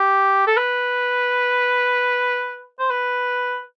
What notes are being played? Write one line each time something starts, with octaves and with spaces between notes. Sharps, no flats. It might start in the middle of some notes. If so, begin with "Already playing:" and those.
Already playing: G4
A4
B4
C5
B4